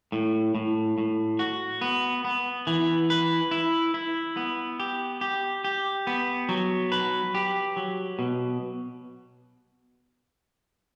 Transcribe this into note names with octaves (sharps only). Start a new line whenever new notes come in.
A2
A2
A2
F#4
B3
B3
E3
B4
E4
E4
B3
G4
G4
G4
B3
F#3
B4
G4
F#3
B2